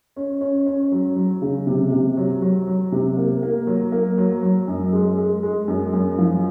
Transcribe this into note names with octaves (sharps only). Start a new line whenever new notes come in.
C#4
C#4
C#4
F#3
F#3
C#3
C3
C3
F#3
F#3
F#3
C3
A#3
A#3
F#3
A#3
F#3
F#3
F#2
G#3
G#3
G#3
F#2
F#2
F3